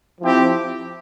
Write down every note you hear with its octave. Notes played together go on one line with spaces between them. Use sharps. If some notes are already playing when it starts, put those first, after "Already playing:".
F3 C4 E4 G4